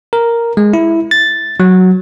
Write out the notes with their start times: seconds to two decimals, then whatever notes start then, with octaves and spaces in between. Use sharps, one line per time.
0.13 A#4
0.57 G#3
0.73 E4
1.11 A6
1.60 F#3